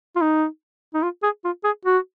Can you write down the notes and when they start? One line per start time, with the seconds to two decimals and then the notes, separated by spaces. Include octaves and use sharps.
0.16 F4
0.21 D#4
0.94 D#4
1.02 F4
1.23 G#4
1.44 F4
1.64 G#4
1.85 F#4